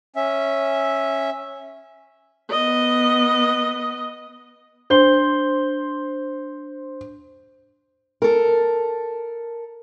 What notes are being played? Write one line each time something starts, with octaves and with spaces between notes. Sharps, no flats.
C#4 E5
B3 D#5
D4 C5 C6 G6 G7
A4 A#4